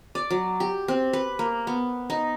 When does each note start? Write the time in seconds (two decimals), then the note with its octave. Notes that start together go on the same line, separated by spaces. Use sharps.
0.15 D5
0.30 F#3
0.60 G4
0.88 C4
1.13 B4
1.39 A#3
1.67 B3
2.10 D#4